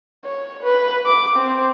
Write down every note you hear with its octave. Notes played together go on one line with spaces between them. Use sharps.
C#5
B4
D6
C4